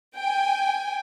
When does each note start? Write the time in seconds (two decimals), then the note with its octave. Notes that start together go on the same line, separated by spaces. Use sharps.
0.17 G5 G#5